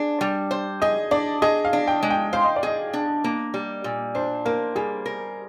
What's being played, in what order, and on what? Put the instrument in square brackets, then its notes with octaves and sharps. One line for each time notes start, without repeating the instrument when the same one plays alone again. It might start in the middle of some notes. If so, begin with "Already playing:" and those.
Already playing: [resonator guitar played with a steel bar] D4 G#4
G3
C5
[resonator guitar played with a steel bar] G#4 [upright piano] D#5
[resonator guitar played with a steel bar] D4 [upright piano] D5
[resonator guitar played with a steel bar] G#4 [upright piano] D#5
[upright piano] F5
[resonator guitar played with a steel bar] D4
[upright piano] G5
[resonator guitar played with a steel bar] G#3
[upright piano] G5
[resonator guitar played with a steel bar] C5 [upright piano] F5
[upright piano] D#5
D5
[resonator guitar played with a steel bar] G#4 [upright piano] D#5
[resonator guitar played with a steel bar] D4
A#3
G3
A#2
[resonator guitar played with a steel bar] D4 [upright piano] C5
[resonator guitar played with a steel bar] A#3 [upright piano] A#4
[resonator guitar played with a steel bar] G3 [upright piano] G#4
[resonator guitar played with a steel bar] A#4